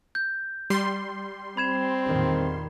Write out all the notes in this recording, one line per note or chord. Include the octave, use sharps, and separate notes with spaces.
G6
G3 C6
C4 B5 G#6 E7
E2 A#2 D#3